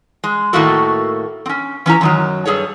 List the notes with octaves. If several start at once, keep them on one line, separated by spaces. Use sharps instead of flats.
G#3
A2 D#3 A3 A#3 F#4 A4
C4 C#4
E3 C#4 E4 A#5
F#2 D#3 F#3
G2 G#4 A4 C#5